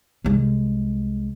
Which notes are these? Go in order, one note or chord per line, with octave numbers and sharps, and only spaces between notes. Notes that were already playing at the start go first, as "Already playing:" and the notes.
C2 G#3